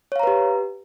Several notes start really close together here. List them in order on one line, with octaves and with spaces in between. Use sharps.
C#5 F5 A#5 B4 G4